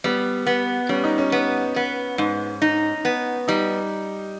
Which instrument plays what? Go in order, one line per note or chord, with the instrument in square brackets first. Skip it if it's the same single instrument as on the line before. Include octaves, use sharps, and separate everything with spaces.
[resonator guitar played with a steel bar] G3 [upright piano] B3
[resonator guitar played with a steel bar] B3
[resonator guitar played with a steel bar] G3 [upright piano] C#4
[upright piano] D#4
C#4
[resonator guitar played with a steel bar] B3
B3
G#2
D#4
B3
[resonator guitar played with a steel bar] G3 [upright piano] D#4